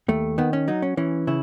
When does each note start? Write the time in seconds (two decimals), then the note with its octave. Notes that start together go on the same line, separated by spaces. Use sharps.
0.08 D#2 A3
0.38 D#3 B3
0.53 C#4
0.68 F#3 D#4
0.82 C#4
0.97 E3 C#4
1.27 C#3 E4